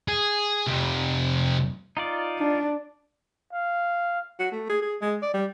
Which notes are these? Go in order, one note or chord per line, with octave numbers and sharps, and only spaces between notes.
G#4
F2 C3
D#4 F4 D5
D4
F5
F#4
A3
G#4
G#4
G#3
D5
G3